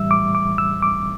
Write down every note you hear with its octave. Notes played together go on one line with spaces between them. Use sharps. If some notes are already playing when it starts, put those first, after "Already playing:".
Already playing: A2 E3 G3 E5 E6
D6
D6
E6
D6